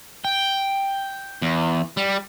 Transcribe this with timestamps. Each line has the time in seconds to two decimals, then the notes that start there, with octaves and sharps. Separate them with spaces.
0.25 G5
1.42 E2
1.97 G3